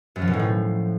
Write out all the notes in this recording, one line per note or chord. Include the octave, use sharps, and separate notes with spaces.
F#2
F3
B2
A2
F3